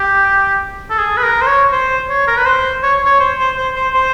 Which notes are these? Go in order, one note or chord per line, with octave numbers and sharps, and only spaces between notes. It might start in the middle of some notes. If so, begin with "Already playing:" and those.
Already playing: G4
A4
G#4
B4
A#4
C5
C#5
C5
C#5
A#4
B4
C5
C#5
C#5
C5
C5
C5
C5
C5